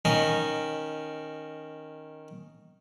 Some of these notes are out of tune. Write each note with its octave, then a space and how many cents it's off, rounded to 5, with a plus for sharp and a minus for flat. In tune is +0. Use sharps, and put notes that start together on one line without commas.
D#3 +0 C#4 +0 D#5 -15